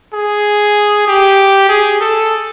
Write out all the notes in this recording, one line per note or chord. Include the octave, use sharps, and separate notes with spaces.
G#4
G4
G#4
A4